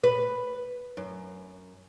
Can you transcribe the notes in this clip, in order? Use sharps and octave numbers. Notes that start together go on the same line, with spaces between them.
B4
F#2